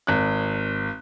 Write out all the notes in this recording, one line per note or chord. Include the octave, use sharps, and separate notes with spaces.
G#1 F#6